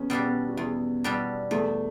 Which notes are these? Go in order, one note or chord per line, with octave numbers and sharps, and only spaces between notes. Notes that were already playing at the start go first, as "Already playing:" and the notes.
Already playing: E2 B3 C#4
B2 G3 D4 G4
B3
F#4
E2 E4
B2 G3 B3 D4 G4
E2 A3